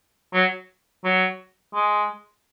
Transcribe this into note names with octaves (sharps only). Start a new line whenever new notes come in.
F#3
F#3
G#3